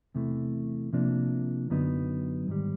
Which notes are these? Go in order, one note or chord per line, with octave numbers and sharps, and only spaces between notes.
E2 C3 E3 A3
C3 F3 A#3 D4
F#2 D3 F#3 B3 D#4
G#2 D#3 G3